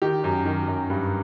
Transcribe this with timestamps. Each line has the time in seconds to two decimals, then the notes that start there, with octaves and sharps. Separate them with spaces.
0.02 D#3 G4
0.24 F#2
0.45 D#3
0.68 F#2
0.90 G2